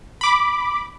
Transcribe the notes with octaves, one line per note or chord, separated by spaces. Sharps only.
B5 D6